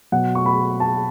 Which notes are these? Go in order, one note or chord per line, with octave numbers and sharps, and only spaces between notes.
B2 F#3 F#5
C#6
B5
A5